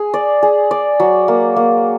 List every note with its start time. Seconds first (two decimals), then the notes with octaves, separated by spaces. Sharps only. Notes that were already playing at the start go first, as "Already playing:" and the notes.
Already playing: G#4
0.14 D5
0.43 G#4
0.71 D5
1.00 F#3
1.28 A#3
1.56 A#3